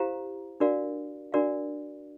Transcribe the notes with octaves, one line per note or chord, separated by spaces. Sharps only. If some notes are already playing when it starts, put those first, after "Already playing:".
Already playing: E4 G4 C5 F5 A#5
D4 F#4 A#4 D5 F5
D4 F#4 A#4 D5 F5